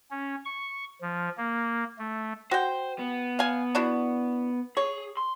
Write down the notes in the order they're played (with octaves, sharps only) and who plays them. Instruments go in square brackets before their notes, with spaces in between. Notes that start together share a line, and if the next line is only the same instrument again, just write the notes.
[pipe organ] C#4
C#6
F3
A#3
A3
[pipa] F#4 G5 [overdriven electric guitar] C5
[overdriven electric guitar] B3
[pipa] F5 G#5
D4 E4 F#4
[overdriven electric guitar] G#4 [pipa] C#5
[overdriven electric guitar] C6